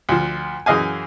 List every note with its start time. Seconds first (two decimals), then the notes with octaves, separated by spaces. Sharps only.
0.09 D2 F3
0.66 F#2 E3 G#4 D#5 F5 G#5